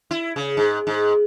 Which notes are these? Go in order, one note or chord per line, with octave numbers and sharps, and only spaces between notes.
E4
C#3
G#2
G#2